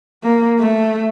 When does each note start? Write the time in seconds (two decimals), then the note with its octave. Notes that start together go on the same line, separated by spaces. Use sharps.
0.23 A#3
0.60 A3